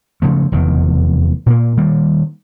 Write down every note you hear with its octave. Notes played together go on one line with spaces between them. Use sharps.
C#3 F3 A3
F1 E2 D#3
A#2 A#3
D#3 G3 A#3